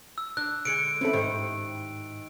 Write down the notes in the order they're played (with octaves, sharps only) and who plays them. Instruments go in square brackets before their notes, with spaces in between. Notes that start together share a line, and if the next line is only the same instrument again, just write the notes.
[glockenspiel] E6
[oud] D4 [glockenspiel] F#6
[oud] D3 G#3 [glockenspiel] C#7 D7
[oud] E3 A3 E4 [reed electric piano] C4 C#4 A4
[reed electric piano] G#2 [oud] D#3 G4 C5